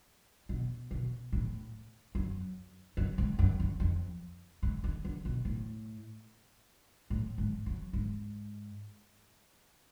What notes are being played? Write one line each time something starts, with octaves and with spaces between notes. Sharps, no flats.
B2
B2
A2
F#2
F#2
G#2
F#2
F#2
F2
G#2
D3
D3
B2
A2
A2
G#2
F#2
G#2